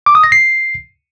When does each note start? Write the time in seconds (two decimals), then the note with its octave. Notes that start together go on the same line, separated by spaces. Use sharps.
0.06 D6
0.15 D#6
0.24 A#6
0.32 C7